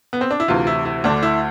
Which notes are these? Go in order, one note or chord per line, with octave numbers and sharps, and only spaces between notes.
B3
C4
D4
E4
D2 C3 E3 F4
E4
E4
D2 D3 D4
E4